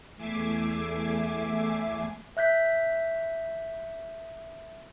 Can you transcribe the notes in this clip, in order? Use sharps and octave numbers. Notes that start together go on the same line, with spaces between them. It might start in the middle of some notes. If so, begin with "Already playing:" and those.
E2 A3 E5 G#5 D6 C7
E5 F#6 G6 B6